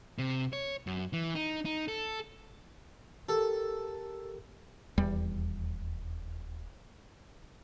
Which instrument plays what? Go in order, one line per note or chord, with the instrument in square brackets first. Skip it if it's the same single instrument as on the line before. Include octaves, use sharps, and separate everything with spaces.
[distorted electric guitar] C3
C#5
F#2
E3
D#4
D#4
A4
[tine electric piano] G4 A#4 [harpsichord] A4
[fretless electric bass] D#1 E2 G3